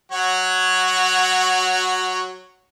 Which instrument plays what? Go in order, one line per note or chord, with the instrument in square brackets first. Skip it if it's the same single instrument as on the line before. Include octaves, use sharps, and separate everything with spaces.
[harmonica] F#3 F#4 C#5